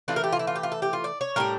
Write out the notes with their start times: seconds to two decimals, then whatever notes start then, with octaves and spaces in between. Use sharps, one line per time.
0.08 E3 A3 D4 F4
0.16 A#4
0.24 G4
0.32 F4
0.39 E4
0.47 F4
0.55 G4
0.63 F4
0.72 A4
0.82 G4
0.93 F4
1.04 D5
1.21 C#5
1.36 A2 G3 D4 A#4